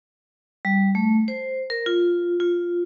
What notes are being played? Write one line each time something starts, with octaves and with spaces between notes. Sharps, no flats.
G3
A3
C5
A#4
F4
F4